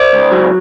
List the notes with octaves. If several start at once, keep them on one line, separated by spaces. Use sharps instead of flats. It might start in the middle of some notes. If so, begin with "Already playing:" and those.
Already playing: C5 D5
C#2
F#3